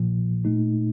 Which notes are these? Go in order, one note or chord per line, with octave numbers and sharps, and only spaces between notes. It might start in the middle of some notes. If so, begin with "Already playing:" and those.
Already playing: A#1 A#2 F3
A#2 A3 D#4